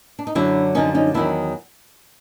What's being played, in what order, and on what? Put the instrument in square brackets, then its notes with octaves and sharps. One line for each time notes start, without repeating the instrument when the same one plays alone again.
[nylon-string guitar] D4
D#4
F#2 D3 F#3 D4 E4
F#2 D3 F3 C#4 D#4
C#4 D#4
E2 C3 D#3 F#3 D4 E4